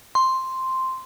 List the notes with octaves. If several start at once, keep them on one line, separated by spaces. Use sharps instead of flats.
C6